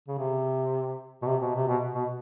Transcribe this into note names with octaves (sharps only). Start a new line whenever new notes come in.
C#3
C3
B2
C3
B2
C3
B2
B2